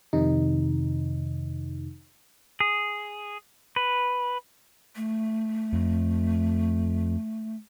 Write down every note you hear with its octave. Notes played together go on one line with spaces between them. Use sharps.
F2 C3 D#3 D#4
G#4
B4
A3
F2